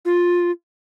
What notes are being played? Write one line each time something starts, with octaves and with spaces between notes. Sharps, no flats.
F4